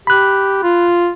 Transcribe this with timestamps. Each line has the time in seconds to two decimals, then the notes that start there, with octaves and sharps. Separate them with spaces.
0.07 G4 B5 F#6
0.63 F4